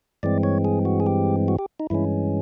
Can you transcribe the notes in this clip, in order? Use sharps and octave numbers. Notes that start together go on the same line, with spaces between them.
G2 E3 G#3 C4 D5
C#5
G#4
F#4
G#4
G4
F#4
G4
D#4
G2 E3 G#3 C#4 E4